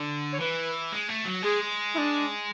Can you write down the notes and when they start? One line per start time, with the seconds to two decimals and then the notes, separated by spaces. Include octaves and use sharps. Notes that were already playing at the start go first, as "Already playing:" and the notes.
Already playing: D3
0.33 C#5
0.40 E3 B4
0.92 G#3
1.09 A3
1.25 F#3
1.43 G#3 G#4
1.94 E4
1.98 D4